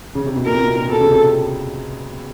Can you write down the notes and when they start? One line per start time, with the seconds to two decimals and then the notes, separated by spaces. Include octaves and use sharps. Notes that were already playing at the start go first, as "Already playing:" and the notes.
0.15 C#3
0.26 C3
0.36 B2
0.46 A#2 A#4
0.55 C3
0.61 B2
0.76 A#2
0.89 B2 A4
1.01 C#3
1.11 C3